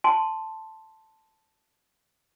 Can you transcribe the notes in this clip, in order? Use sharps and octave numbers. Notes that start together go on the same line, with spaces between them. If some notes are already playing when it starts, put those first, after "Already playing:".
A5 C6